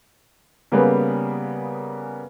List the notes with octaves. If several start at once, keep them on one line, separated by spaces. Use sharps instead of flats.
C#3 G3 A#3 B3 G#4 B4